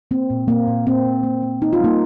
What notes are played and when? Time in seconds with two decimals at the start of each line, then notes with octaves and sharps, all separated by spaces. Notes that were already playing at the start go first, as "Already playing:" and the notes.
0.11 A#3 C4
0.30 A#2
0.48 A#2 A#3
0.68 A#2
0.87 A#3 C4
1.06 A#2
1.23 A#3
1.42 A#3
1.61 A#3 D#4
1.73 F4
1.80 G3 A#3 D#4